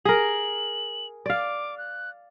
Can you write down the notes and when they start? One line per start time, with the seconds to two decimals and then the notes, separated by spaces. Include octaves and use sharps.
0.05 G#4 A#4 F#7
1.26 D5 F5 D6
1.78 F#6